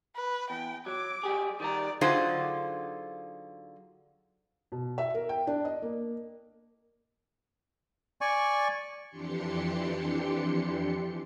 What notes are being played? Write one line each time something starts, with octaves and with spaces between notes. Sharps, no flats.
B4
E2 G5
F#3 D6
F#3 G4 G#4
D#3 G3 D5 A#5
D3 F#3 D#4 F4 G#4 C5
B2
E5
A#4
G5
D4
D#5
A#3
D5 G#5 C#6
F2 E3 D4 G4 C6 C#7